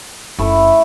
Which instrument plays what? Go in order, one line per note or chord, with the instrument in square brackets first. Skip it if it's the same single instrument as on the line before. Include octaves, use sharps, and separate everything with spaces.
[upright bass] F#1 [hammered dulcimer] A3 E4 A4